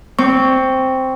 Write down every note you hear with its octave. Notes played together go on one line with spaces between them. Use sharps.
C4 C#6